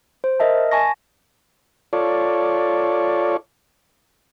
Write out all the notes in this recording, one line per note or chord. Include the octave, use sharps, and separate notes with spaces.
C5
A#4 D#5 E5 A5
G#5 A5 C#6 A#6
F4 A4 C#5 D5